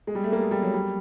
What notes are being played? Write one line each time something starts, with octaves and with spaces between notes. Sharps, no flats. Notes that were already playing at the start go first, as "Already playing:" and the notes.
G#3
G3
A3
A#3
G#3
G3
F#3
G3